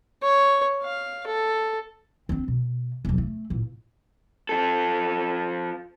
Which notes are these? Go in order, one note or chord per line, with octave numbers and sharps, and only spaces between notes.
C#5
F5
A4
C4 D4
B2
E1 F#3
A3
A1 A#2
F3 A4